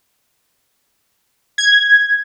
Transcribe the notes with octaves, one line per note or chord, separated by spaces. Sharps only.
G#6